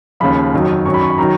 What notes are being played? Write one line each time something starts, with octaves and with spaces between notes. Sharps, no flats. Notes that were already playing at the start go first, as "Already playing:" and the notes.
D#2 C#3 F3 B5
F2 D#3 F#3
F#2 D#3 F#3 C#6
B5
C#6
B5
D#3 F#3 A#5